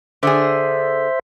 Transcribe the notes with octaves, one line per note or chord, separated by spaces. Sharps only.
D3 D4 G#4 C5 E5